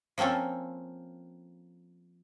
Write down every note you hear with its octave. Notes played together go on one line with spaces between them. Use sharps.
F3 A#3 C4 C#4 A4